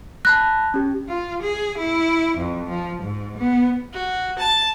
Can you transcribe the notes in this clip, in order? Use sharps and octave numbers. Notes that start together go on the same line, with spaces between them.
A5 B5 F#6 A#6
C#4 G4
F4
G#4
E4
F2
F3
G#2
B3
F#4
A5